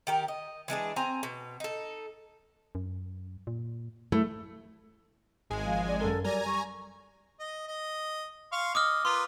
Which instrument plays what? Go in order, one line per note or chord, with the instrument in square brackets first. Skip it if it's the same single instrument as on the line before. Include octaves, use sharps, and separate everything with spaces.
[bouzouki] D#3 G4 A#4
D#5
E3 G#3 D4 G#4
C4 G#5 A#5
B2
D#4 A4
[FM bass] F#2
A#2
[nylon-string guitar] A3 [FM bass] E4
[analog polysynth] G#1 G#3 G#5
[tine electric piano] F3 [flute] F5
[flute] D5
[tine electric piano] F#2 A#4 [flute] A4
[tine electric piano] F#3 G3 A#4 [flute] D5 [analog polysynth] G#5 A#5
[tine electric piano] G3 [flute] C#6
[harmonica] D#5
D#5
F5 C6 C#6
[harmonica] D#5 [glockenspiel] D6 D#6 F6
[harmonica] A#3 F4 B4 [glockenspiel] C6